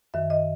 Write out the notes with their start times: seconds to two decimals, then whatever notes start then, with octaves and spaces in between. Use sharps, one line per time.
0.14 F#2 D#3 E5
0.30 D#5